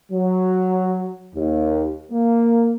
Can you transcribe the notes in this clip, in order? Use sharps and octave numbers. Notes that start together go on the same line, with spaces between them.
F#3
D#2
A#3